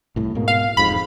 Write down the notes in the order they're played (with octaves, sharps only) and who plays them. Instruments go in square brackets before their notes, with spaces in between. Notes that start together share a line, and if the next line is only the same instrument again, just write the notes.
[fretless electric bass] C2 A2
G#2 B2 A#3
[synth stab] F5
[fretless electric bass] E1 F2 G#2 [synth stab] B5